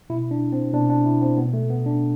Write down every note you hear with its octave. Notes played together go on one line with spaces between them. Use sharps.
B2 E4
D4
C4
B2 D4
D4
E4
C4
B2 B3
A3
B3
D4